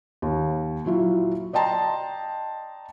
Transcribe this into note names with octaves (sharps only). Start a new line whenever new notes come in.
D#2
A#2 F#3 E4 F4
D5 D#5 G5 A5 A#5 C6